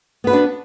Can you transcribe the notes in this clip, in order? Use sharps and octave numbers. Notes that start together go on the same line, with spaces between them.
B3 D4 F#4 B4